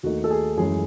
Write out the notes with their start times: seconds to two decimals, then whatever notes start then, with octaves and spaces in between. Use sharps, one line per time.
0.03 D#2 D#3 A3 D#4 F#4
0.24 A4
0.30 G#4
0.57 F#2 E3 G#3 C#4 G#4